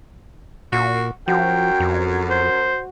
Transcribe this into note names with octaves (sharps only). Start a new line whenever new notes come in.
A#2 F#4
F#2 F3 F#4 G5
F2
C5